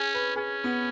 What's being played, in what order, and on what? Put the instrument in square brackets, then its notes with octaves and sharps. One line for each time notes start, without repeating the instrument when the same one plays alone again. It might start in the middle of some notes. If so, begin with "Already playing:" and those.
Already playing: [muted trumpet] C#4 [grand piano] G#4
[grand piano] B4
[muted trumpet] C#4 [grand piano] G#4
[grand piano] B3